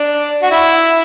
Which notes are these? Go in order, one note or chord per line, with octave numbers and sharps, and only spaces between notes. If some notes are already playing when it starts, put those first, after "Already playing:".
Already playing: D4
F#4
E4